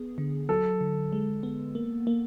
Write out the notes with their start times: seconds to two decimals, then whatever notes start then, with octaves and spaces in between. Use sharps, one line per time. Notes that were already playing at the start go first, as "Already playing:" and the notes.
Already playing: B3 G#4
0.18 D3
0.49 F#3 A4
0.81 D3
1.12 G#3
1.43 B3
1.75 A#3
2.07 A#3